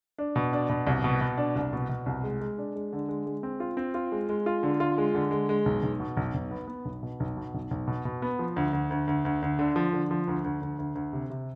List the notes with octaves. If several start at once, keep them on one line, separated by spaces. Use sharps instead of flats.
D4
B2
D4
B2
C2
B2
B2
D4
C2
B2
B2
C2
G#3
G#3
D4
G#3
D3
G#3
G#3
C4
F4
C4
F4
G#3
G#3
F4
D3
F4
G#3
D3
G#3
G#3
B1
B1
B2
B1
B1
B3
B3
B1
B2
B1
B2
B1
B1
B2
B2
B3
F3
D2
D2
D2
D2
D2
D2
D3
F3
D3
F3
D2
D2
D2
D2
D2
C3
C3